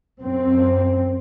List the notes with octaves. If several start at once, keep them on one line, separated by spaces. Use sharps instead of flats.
F#2 C4